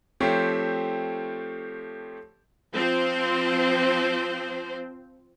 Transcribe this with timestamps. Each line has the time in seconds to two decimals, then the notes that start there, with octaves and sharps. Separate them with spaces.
0.20 F3 A3 C4 G4 C#5
2.74 F3 C4 C5